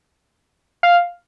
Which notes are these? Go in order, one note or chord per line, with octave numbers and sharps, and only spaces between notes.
F5